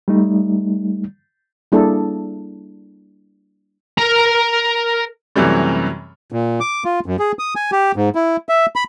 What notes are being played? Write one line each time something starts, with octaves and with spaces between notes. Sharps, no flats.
G3 A3 D#4
G3 A#3 D4 E4 G#4 A4
A#4 A#5
F#2 C3 E3 F#3 G3 A3
A#2
D6
F4
F#2
G#4
D#6
G#5
G4
G#2
E4
E5
B5